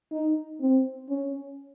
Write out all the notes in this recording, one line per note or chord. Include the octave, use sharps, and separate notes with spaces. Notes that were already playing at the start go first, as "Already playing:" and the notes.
D#4
C4
C#4